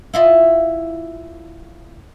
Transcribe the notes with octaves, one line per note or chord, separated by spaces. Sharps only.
E4 F4 D#5